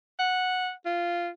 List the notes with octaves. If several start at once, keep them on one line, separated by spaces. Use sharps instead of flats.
F#5
F4